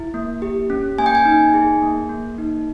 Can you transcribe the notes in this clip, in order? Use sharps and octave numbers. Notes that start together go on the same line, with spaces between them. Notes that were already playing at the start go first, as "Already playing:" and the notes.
Already playing: E4
A#3
G4
C#4
A#3 G#5
G5
G#5
D#4
G#4
A#3
A#3
D#4